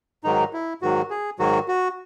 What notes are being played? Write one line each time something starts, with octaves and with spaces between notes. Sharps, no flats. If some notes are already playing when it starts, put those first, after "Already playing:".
G#2 D#3 F#3 D#4
E4
G#2 D#3 F#3 F#4
G#4
G#2 D#3 F#3 F#4
F#4